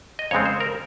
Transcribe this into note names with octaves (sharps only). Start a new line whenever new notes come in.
D#5
F2 C#3 G#3 C4 C#5
C5
A#4